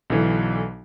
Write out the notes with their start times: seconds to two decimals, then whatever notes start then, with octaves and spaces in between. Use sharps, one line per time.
0.10 B1 D3 E3